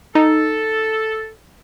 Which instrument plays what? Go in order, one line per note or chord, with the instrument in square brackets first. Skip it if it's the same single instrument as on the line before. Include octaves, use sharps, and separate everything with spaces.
[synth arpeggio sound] D#4 [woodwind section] A4